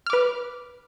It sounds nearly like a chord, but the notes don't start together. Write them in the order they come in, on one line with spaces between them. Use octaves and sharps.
F6 D6 B4